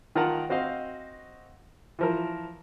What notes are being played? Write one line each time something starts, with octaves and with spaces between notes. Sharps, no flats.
D#3 F4 A#4 F#5 A5
C4 F#4 C5 D#5 F5
E3 F3 A#4